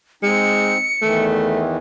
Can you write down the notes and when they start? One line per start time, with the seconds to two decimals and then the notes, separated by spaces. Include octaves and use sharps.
0.23 G#3 C4 D#4 C#7
1.02 E2 D#3 E3 A3